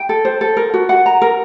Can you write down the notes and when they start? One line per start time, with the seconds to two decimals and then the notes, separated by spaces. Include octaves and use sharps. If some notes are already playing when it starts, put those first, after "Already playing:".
Already playing: G5
0.09 A4
0.25 C5
0.41 A4
0.57 A#4
0.74 F#4
0.89 F#5
1.06 A#5
1.22 A#4